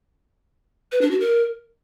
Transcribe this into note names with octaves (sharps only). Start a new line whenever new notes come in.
B4
D4
F#4
A#4